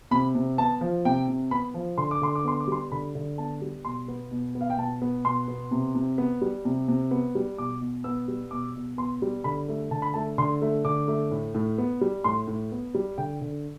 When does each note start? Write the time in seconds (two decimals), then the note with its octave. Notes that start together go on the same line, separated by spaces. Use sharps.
0.11 C3 B5
0.35 C3
0.58 B3 A5
0.81 F3
1.05 C3 G5
1.28 C3
1.51 B3 B5
1.74 F3
1.98 D3 C6
2.11 D6
2.21 D3 C6
2.35 D6
2.45 B3 C6
2.60 D6
2.68 G3 C6
2.92 D3 B5
3.15 D3
3.38 B3 A5
3.62 G3
3.85 B2 C6
4.08 B3
4.31 B2
4.55 B3
4.61 F5
4.70 G5
4.78 B2 A5
5.02 B3
5.25 B2 C6
5.48 B3
5.71 C3
5.95 C3
6.18 B3
6.42 G3
6.65 C3
6.88 C3
7.11 B3
7.35 G3
7.58 B2 D6
7.81 B2
8.04 B3 E6
8.28 G3
8.51 B2 D6
8.75 B2
8.98 B3 C6
9.22 G3
9.44 D3 B5
9.69 A3
9.91 D3 A5
10.02 B5
10.14 A3 A5
10.38 D3 C6
10.62 A3
10.85 D3 D6
11.08 A3
11.31 A2
11.55 A2
11.78 B3
12.01 G3
12.24 A2 C6
12.47 A2
12.72 B3
12.94 G3
13.18 D3 G5
13.41 D3